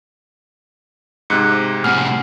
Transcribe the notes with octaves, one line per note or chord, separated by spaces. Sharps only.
G#2 C3 F#6 C#7
A2 C3 F#5 G#5 F6 C7